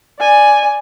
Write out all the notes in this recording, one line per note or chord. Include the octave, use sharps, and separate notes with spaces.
D5 G#5